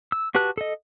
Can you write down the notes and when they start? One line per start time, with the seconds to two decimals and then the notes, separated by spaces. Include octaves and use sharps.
0.12 E6
0.35 F#4 G4 B4 A5 F#6
0.58 A4 D#5